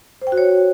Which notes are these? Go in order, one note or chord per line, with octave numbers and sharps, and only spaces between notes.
C5
G5
F#4
C#5